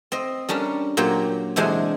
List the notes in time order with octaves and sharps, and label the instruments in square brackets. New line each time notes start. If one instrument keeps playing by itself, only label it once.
[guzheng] C4 D#5
G3 C#4 D4 A#4
A#2 F#3 A#3 G4 C5
E2 C3 G#3 D4 C5 G#5